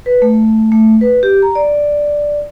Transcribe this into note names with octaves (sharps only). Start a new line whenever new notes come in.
B4
A3
A3
B4
G4
A#5
D5